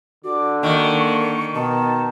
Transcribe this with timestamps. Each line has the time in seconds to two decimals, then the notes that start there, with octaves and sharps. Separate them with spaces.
0.25 D3 F#4 D6
0.63 D#3 A#3 C#6
1.55 B2 D#3 A5